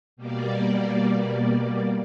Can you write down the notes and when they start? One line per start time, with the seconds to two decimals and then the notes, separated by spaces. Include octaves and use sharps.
0.16 B2 G3 A#3 D5